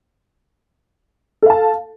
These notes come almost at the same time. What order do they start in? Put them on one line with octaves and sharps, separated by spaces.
A4 F5 A5